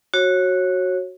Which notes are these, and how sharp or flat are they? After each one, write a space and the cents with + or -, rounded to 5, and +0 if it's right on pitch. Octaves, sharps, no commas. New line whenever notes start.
F#4 +0 C#5 -25